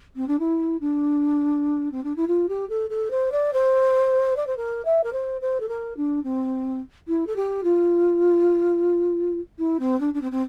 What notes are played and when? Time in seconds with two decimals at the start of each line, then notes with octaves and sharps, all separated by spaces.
0.16 C4
0.27 D4
0.39 E4
0.80 D4
1.91 C4
2.03 D4
2.16 E4
2.27 F4
2.48 G4
2.69 A4
2.90 A4
3.10 C5
3.32 D5
3.53 C5
4.36 D5
4.46 C5
4.56 A#4
4.85 E5
5.03 A#4
5.12 C5
5.41 C5
5.60 A4
5.68 A#4
5.96 D4
6.23 C4
7.07 E4
7.26 A4
7.36 G4
7.63 F4
9.58 E4
9.79 C4
10.00 D4
10.13 D4
10.21 C4
10.31 C4